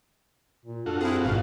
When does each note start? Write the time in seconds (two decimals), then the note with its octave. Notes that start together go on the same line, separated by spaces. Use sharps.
0.65 A#2
0.86 F#2 D4 F4 F#4 A4
1.01 C4 E4 G#4
1.25 G#1 G#2 B2 F5